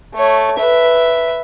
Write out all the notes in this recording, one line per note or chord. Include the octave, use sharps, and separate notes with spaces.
A3 C#5
B4 E5